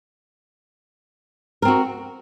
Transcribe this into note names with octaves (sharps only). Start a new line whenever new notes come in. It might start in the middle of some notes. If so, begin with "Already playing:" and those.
C4 F#4 A#4